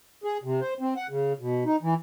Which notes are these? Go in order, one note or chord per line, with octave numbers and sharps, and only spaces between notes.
G#4
C3
C5
C4
F#5
C#3
B2
D#4
E3